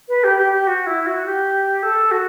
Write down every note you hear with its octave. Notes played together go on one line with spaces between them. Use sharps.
B4
G4
G4
G4
F#4
E4
F#4
G4
A4
F#4